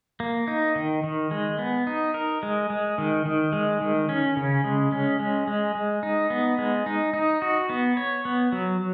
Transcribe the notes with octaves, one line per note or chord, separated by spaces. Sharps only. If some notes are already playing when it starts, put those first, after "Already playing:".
A#3
D#4
D#3
D#3
G#3
B3
D#4
A#4
G#3
G#3
D#3
D#3
G#3
D#3
C#4
C#3
G#3
C#4
G#3
G#3
G#3
D#4
B3
G#3
D#4
D#4
F#4
B3
C#5
B3
F#3